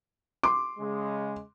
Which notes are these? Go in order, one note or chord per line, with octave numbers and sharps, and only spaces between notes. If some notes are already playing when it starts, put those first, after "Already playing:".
C6 D6
C#3 G#3